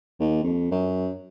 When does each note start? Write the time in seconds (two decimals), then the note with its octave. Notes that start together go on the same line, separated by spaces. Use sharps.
0.20 D#2
0.43 F2
0.71 F#2